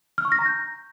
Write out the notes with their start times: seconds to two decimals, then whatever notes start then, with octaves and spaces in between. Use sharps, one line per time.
0.18 F6
0.25 C#6
0.32 A#6
0.39 A#5
0.46 G6